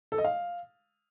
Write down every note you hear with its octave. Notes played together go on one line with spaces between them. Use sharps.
A4
D#5
F5